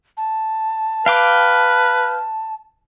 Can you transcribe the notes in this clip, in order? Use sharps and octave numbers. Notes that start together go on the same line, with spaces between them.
A5
B4 F5 G5 D6